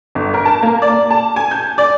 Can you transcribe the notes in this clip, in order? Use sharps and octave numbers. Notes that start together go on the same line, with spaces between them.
G1
A#4
A5
A#3
D5
A5
G#5
G6
D5